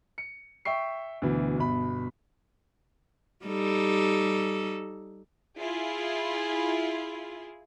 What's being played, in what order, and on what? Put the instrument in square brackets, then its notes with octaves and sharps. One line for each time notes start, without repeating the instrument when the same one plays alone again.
[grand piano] C#7
E5 G5 C#6 C7
D2 B2 E3
G1 B2 B5
[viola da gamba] G3 D#4 A4
[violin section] E4 F4 G#4